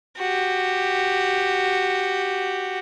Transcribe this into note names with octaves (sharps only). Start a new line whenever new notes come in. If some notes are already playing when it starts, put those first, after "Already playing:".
F#4 G4